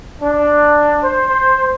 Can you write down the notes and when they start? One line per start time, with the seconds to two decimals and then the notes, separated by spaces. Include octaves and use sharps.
0.22 D4
1.04 C5